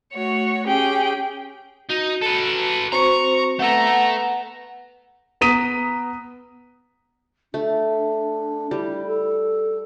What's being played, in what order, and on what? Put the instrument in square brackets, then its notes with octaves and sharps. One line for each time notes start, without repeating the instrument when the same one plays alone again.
[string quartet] A3 F#4 C#5
C#4 G4 G#4 G5
[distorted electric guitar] D#4 [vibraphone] F#4
[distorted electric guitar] A4 B4
[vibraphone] C4 F#4 C5 [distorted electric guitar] A#5 [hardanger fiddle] C#6
[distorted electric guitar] A3 A4 [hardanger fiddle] B3 A#5 [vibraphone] F#5
[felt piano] B3 A#5 D#6 B6 D#7
[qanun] A3 [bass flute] D4
[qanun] G3 [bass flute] E4
[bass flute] A4